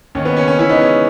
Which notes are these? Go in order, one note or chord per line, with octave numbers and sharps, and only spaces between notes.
D#2 C#4
B3
C#3 C#4
C#4
E3 C#4 E4
B3 D#4
G#3 C#4